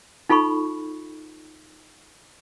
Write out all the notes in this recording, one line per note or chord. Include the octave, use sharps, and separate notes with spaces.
D#4 F4 A4 B5 C#6